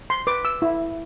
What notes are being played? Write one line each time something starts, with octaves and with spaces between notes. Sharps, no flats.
C6
B4 D6
E6
E4